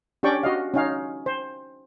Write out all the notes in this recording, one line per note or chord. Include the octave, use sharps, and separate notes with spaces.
C#4 D4 G4 D5 G5 C#6
F#4 D#5 F5
C#4 D#4 F5
C5